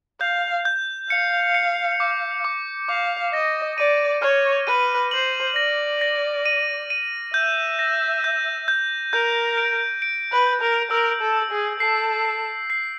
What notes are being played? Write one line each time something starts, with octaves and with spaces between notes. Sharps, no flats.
F5 G6
G6
F5 C#7
C#7
D6
D6
F5 D6
D#5 A#6
D5 D#7
C#5 F6
B4 D#7
C5 F#7
D5 A#6
A#6
D#7
D#7
E5 G6
A#6
G6
G6
A#4 G6
D7
D7
B4
G6
A#4
A#4 E6
A4
E6
G#4
A4 C7
C7
C7